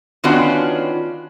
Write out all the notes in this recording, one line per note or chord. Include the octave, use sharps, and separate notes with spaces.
D#3 B3 C#4 D4 F4 F#4